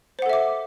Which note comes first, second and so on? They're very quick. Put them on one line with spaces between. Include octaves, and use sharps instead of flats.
C5 F#5 A4 E5 D6